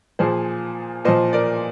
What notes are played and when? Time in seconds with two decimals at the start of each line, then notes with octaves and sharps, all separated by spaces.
0.19 A#2 F3 G#4 C5
1.05 A#2 F3 C5 D#5
1.33 A#4 D5